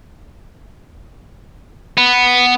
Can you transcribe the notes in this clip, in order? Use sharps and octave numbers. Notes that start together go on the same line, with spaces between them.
B3